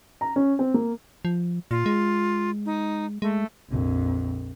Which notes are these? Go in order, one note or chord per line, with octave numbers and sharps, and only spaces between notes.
A#5
C#4
C4
A#3
F3
A#2 F4
G#3
D#4
G#3 A3
A#1 F2